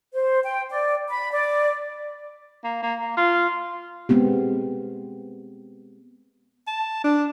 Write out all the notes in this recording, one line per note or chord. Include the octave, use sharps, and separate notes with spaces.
C5
G5
D5
B5
D5
A#3
A#3
A#3
F4
G#3 B3 C4 G4
A5
D4